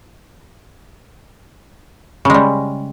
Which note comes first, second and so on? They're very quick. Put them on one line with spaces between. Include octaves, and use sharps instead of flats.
C#3 G#3 G3